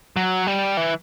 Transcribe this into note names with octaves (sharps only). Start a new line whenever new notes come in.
F#3
G3
E3